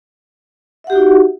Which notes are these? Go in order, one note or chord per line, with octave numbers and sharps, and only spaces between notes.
D#4 F#4 G4 E5 F#5